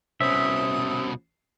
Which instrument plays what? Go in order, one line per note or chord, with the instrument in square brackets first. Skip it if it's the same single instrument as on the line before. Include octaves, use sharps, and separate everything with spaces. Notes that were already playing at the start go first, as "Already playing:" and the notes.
[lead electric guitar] C2 B2 [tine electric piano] C#4 C5 [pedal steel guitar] E5 [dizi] D#6